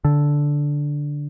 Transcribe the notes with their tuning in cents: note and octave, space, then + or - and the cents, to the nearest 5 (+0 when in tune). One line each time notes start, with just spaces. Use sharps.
D3 -5